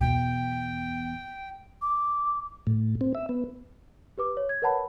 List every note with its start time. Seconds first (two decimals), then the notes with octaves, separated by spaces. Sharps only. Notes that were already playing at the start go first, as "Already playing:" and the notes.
0.01 E2 B2 G5
1.82 D6
2.67 A2
3.01 C4
3.15 E5
3.29 B3
4.18 G4 B4 D6
4.37 C#5
4.49 G#6
4.62 A#4 B4 C#5 F#5 A5 B5